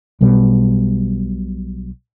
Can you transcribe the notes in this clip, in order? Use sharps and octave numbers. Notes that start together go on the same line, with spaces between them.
B1 B2 G3